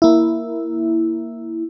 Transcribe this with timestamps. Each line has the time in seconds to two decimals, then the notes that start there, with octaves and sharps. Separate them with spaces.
0.02 A#3 E4